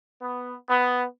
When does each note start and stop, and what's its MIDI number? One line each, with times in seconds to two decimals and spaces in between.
0.20 0.53 59
0.68 1.03 59